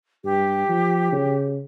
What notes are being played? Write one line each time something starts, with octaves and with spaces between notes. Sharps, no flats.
G2 G4
F3
C#3